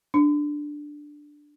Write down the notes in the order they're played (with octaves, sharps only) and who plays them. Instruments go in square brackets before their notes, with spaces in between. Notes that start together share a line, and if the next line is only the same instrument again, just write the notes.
[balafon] D4